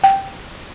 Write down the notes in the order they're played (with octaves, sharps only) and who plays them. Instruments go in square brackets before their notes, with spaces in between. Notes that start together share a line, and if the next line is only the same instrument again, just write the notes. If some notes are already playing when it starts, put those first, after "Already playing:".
[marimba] G5